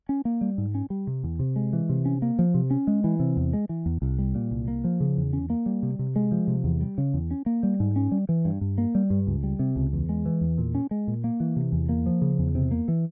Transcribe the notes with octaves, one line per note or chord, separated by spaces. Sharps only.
C#4
A#3
G3
G#2
C#4
G3
C3
E2
C3
G#3
E3
C3
C#4
A#3
F3
C3
C#4
G#3
E3
C3
E2
G#3
E3
E2
C2
G3
A#2
C2
A#3
F3
C#3
E2
C#4
A#3
G3
C3
C3
G#3
F3
C3
E2
G3
C#3
E2
C#4
A#3
G3
G#2
C#4
G3
E3
G2
G2
A#3
G3
G2
C#2
G3
C3
C#2
E2
G#3
E3
E2
A#2
C#4
G#3
A#2
A#3
E3
C3
E2
A#3
F3
C#3
E2
C3
A#3
E3